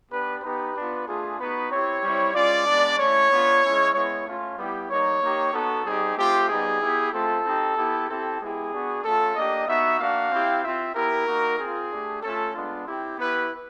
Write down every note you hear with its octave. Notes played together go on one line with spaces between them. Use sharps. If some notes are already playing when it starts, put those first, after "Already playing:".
B3 D4 G4 B4
B3 D#4 G4 B4
B3 D4 F4
A3 D4 F4 G#4
B3 D#4 F#4 B4
C4 E4 G4 C#5
G3 C4 E4
G#3 C#4 F4 D5
G#3 B3 D4
A3 C#4 E4 C#5
B3 D4 F4
G#3 C#4 E4
G#3 B3 E4 C#5
A3 C#4 F4
G3 B3 E4 G4
G3 A#3 D#4 C#5
A#3 D#4 G4
B3 D#4 F#4 A4
G3 C4 D#4 G4 G#4
A3 C4 F4 G4
G3 B3 D#4 G4 G#4
B3 E4 G4
A3 C4 F4 A4
C4 D#4 G4
B3 E4 G4
C4 E4 G4 A4
G#3 B3 E4 G4 G#4
B3 D4 F#4
A3 C#4 F4 A4
A#3 D4 G4 D#5
B3 D#4 F#4 E5
A#3 D4 F#4 F5
C4 E4 G4
C4 F4 E5
B3 E4 G4 A#4
A#3 D#4 F#4
C4 F4 G#4
A3 D4 G4
A3 C#4 F4 A4
G#3 B3 D4 F4
C4 E4 G4
B3 E4 G4 B4